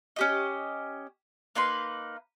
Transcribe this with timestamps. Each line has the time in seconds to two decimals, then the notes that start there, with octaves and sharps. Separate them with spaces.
0.16 C#4 G4 D#5
1.55 A#3 D#4 B4 C6